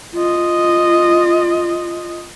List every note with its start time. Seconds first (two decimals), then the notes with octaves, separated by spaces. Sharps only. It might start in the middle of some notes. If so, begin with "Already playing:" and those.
0.14 F4 D#5